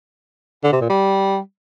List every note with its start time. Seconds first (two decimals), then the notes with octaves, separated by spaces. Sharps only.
0.64 D3
0.72 C3
0.81 A#2
0.90 G3